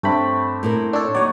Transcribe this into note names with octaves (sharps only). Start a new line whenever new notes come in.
G2 A3 C4 D4 B5
A2 E4 A#4
D4 A4 C#5
D#2 F#3 D#4 C#5 D5